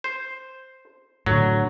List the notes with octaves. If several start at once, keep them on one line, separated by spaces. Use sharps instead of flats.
C5
A2 D3 F#3